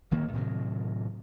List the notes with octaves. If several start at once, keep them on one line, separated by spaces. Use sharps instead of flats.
D1 D#3 A#3
A2 C3 D#3 F#3